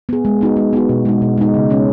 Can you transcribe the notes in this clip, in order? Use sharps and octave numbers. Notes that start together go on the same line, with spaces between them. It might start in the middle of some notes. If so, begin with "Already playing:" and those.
B3 G#4
G#3
B3 D#4 F#4
G#3
B3 D#4 F#4
B2
G#3 D#4
B2
G#3 D#4
C#3
G#3 C#4